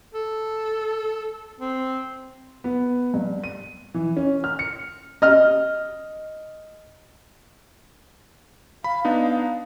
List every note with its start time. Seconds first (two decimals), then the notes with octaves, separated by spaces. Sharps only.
0.14 A4
1.60 C4
2.64 B3
3.14 G2
3.44 D#7
3.94 E3
4.17 C#4
4.44 F6
4.59 C#7
5.22 D#5 F6
8.84 F5 B5
9.05 B3 D4 D#4 F5